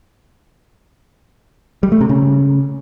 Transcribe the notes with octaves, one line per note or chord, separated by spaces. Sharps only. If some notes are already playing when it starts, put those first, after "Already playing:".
G3
A3
C3
C#3